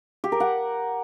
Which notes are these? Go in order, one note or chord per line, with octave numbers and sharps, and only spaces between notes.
G4
A#4
F#5